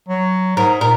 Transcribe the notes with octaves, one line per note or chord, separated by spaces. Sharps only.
F#3
G#2 A#4
A#2 A#4